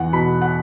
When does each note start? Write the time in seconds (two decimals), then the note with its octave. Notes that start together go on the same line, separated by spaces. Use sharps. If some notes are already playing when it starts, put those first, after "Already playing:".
Already playing: E2 F#5
0.13 B2 B5
0.42 F#5